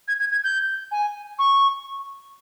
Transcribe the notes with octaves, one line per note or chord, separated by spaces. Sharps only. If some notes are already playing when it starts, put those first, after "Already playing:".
G#6
G#6
G#6
G6
G#5
C#6